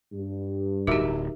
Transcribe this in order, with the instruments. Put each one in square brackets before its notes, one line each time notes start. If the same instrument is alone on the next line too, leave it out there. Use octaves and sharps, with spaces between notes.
[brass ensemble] G2
[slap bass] D1 [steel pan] D#4 A#4 E5 [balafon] F#4 G4